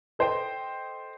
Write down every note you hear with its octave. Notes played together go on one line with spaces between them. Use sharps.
A4 C5 D#5 G5